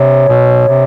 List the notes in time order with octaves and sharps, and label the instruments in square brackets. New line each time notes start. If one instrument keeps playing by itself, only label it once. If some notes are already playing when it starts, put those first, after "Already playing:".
Already playing: [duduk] C3 [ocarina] C#5
[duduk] B2
C3